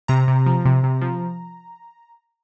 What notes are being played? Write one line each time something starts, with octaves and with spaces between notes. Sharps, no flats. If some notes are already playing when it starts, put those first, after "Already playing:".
C3 A#5
C3
F3
C3
C3
F3